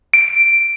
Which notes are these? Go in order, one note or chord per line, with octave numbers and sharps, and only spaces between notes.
D7